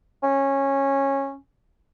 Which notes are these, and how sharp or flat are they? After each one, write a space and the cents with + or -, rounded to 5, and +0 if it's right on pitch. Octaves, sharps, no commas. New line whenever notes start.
C#4 -15